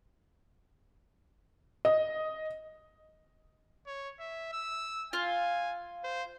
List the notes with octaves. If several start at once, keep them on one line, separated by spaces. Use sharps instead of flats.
D#5
C#5
E5
E6
F4 G#5
C5